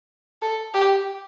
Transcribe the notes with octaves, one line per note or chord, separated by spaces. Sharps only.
A4
G4